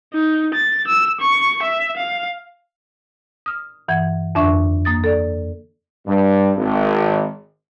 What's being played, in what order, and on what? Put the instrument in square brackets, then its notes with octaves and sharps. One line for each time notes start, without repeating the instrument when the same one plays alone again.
[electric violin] D#4
A6
E6
C#6
E5
F5
[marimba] D#6 F6
G2 E3 F#5 G#6
F2 D3 D4 E5 C#6
A#3 D#6 A6
A4 D5
[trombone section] G2
G#1